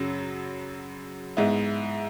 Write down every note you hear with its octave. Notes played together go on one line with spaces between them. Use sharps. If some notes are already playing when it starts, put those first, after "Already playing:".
Already playing: F#2 C#3 F#3
G#2 G#3 B3 E4